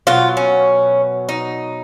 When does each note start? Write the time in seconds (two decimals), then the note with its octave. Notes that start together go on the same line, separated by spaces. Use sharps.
0.07 B2 F#3 F4
0.37 C#4
1.29 D#4